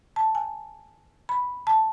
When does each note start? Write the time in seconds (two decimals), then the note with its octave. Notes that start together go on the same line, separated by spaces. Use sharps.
0.16 A5
0.35 G#5
1.29 B5
1.67 A5